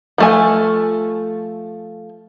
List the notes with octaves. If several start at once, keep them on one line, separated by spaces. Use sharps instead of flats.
F3 A3 G#5